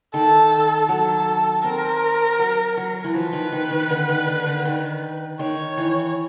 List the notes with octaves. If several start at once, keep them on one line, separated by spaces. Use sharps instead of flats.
D#3 A4
F#3 A4
C4 A#4
F#3
F#3
E3
F3 B4
D#3
D#3
D#3
D3
D#3
D3
D3
D#3
D#3 C#5
E3